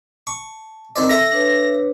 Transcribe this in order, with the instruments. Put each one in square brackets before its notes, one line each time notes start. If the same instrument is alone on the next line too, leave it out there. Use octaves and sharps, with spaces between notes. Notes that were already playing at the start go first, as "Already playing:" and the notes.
[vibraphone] A5 [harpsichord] C#6
[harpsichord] D#3 C4 D5
[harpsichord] A4 E5 [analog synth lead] A#6
[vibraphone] D4 B4 C#5